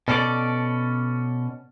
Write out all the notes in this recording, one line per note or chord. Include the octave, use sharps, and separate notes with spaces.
B2 C#4 A4 C5 D5